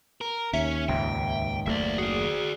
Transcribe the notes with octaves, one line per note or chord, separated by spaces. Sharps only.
A#4
D#2 C#4 E5
C#2 G#2 G5
F#1 A3 A#3 D5 E5
F#4 G#4 D5